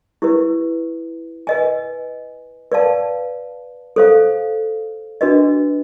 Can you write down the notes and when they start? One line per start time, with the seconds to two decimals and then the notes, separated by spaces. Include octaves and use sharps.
0.22 E4 G4 B4
1.47 B4 D#5 G#5
2.72 B4 D5 F5 A5
3.96 A4 C5 F5
5.21 D4 F#4 B4 D#5